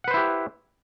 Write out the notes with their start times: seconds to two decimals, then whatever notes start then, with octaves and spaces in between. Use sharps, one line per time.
0.04 F#5
0.08 B4
0.11 C5
0.14 E4
0.17 G4